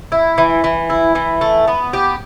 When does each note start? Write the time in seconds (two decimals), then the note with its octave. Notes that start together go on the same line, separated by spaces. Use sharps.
0.12 E4
0.38 E3
0.64 E3
0.90 E4
1.15 E3
1.41 A3
1.67 B3
1.93 G4